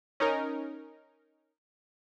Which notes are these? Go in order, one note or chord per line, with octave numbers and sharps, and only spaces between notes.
C#4 D#4 A#4